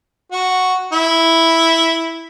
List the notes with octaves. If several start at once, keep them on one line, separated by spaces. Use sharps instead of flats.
F#4
E4